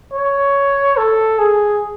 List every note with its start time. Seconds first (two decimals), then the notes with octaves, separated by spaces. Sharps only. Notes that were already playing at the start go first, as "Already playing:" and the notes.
0.13 C#5
0.97 A4
1.39 G#4